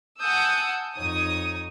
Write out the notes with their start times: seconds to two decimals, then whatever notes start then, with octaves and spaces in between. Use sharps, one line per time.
0.21 F#5 G#5 A5 D#6 E6 G6
0.96 F2 D#4 C#5 D#6